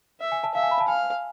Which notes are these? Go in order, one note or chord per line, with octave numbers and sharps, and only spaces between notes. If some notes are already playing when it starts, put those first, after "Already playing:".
E5
G#5
A5
E5 F5
G#5
B5
A5
F5 G#5